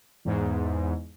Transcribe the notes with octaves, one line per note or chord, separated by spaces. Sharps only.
E2 G#2